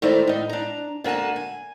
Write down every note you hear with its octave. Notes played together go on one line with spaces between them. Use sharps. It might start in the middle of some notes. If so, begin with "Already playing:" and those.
D#3 A3 E4 C5 D5 A#5
A2 D#4
D4 A#5
D3 A#3 F#4 G#5 A5
G#5